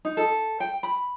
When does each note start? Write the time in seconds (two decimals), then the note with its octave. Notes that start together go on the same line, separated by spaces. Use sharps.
0.05 D#4
0.17 A4
0.60 G5
0.83 B5